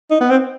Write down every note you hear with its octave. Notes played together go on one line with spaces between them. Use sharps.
D#4
B3
C4